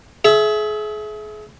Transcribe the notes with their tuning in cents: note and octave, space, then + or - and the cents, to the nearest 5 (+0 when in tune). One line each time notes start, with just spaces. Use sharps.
G#4 +35 E5 +0